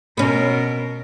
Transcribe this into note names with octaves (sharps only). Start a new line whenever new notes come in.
B2 B3 C#4 A#4